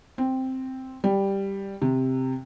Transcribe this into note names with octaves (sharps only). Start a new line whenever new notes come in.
C4
G3
C3